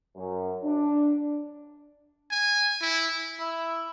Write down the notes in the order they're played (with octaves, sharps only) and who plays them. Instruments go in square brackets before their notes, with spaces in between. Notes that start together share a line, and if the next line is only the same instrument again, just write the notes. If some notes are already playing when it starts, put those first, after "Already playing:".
[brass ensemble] F#2
D4
[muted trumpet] G#5
E4
[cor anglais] E4